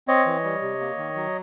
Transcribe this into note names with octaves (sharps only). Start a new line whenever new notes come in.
C4 C#5 D#5
E3
G3
C3
A#3
D#3
F#3